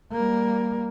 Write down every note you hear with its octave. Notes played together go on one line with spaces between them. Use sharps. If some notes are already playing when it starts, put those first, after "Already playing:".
G3 A#3